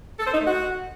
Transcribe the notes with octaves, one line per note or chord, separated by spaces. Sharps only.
A4
C5
D#4
A3
F#4